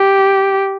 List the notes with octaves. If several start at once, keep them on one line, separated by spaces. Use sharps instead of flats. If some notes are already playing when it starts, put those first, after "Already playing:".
Already playing: G4